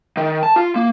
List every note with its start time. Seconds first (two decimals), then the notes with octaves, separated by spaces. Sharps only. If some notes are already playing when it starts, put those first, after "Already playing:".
0.17 D#3
0.43 A5
0.56 F4
0.76 A#3